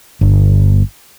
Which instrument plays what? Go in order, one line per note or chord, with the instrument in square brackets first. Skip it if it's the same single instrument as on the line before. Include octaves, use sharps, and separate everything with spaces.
[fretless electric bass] G1